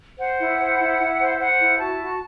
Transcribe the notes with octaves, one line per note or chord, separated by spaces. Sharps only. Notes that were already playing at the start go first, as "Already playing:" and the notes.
C5 F#5
E4
C5
E4
E4
C5
C5 F#5
E4
F#4 A5
F#4